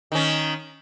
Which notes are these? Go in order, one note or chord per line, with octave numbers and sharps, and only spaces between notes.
D#3 C#4